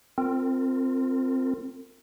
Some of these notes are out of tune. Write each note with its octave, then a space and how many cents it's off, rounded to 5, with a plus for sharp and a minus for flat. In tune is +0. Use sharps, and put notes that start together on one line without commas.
C4 +0 F4 +0 A#4 -35